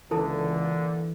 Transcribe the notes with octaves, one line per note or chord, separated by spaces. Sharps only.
C#2 A#2 D3 E3 E4 A4 A5